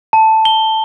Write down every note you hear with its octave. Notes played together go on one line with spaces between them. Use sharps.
A5
G7